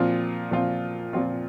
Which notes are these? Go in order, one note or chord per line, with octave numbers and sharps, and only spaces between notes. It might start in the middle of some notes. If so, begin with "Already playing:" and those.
Already playing: A#2 F3 C4 F4
A#2 F3 C4 F4
A#2 F3 C4 F4